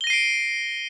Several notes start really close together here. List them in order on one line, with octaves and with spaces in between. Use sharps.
G7 A#6 D#7 C7 D7